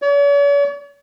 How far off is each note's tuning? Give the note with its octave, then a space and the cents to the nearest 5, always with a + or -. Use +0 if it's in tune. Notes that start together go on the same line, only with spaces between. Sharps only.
C#5 +45